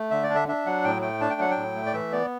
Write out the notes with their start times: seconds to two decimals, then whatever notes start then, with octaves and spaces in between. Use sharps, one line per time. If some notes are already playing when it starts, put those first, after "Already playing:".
Already playing: A3
0.11 D3 E5
0.23 D5
0.30 D4
0.35 E5
0.48 D4 E5
0.66 F#3 F#5
0.84 A2 G5
1.02 A3 G5
1.21 D4 A5
1.30 G5
1.39 F#3 F#5
1.51 G5
1.57 A2
1.76 A3
1.86 D5
1.94 E3 E5
2.12 B3 D5